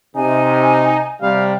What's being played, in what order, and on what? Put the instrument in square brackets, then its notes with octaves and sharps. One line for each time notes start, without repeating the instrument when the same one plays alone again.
[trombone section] C3 [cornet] D#4 [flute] G#5
[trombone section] C3 G3 [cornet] F5